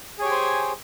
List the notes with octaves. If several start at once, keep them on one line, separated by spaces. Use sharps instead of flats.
G4 G#4 C5 C#5 G#5